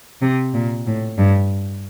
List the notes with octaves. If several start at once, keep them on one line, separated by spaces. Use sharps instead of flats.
C3
A#2
A2
G2